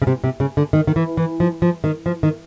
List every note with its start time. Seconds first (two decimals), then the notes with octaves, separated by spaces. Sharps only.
0.02 C#3
0.07 C3
0.24 C3
0.40 C#3
0.57 D3
0.73 D#3
0.87 D#3
0.96 E3
1.17 E3
1.40 F3
1.62 F3
1.84 D#3
2.06 F3
2.23 D#3